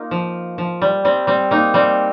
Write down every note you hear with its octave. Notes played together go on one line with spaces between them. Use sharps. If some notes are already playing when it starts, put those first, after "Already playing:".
Already playing: A#3 D#4 F4
F3
F3
G3
G3 C4
G3 C4
A#3 D#4
G3 C4